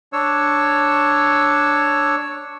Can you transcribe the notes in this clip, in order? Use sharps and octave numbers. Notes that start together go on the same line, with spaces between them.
D4 C#5 E6